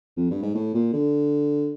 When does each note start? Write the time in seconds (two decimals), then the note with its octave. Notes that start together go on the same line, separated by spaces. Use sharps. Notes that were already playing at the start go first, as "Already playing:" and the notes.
0.17 F2
0.31 G2
0.42 G#2
0.55 A2
0.74 A#2
0.93 D3